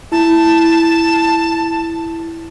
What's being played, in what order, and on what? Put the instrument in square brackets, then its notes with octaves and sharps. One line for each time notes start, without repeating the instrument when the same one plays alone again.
[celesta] E4 [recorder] A5